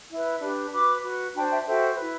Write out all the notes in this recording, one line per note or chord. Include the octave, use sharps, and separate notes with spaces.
E4 B4
D4 G4 B4
F#4 B4 B5 D6
F#4 B4
D4 F#4 C5 G5 B5
E5 G5
F#4 A4 C5 E5 G5
E4 B4